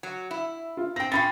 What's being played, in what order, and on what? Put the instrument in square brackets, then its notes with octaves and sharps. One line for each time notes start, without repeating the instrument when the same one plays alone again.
[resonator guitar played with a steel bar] F#3
E4
[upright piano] F4
[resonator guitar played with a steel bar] C4 G5 [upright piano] A#6
[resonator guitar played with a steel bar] C#4 D#4 F4 [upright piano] G5 B5 A6